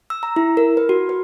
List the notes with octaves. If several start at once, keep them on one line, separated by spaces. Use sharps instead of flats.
E6
A#5
E4
A#4
B4
F#4
B4